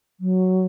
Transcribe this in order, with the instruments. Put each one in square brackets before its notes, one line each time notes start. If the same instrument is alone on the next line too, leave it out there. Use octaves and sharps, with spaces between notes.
[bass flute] F#3